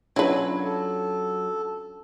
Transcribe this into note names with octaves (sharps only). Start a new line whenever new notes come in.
F#3 C#4 D4 E4 F4 B4
A4